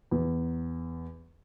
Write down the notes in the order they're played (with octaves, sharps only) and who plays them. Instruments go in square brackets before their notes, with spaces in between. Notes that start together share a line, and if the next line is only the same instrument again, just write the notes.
[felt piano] E2